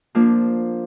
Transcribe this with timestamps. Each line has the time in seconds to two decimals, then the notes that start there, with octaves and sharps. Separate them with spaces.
0.15 F3 A#3 D4